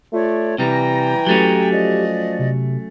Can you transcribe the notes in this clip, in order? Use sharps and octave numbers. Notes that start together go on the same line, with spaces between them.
A3 F4 C#5 D5
C3 E3 G3 G5 G#5 A#5 A#6
F#3 A3 C#4 G4
F3 D5 D#5
C3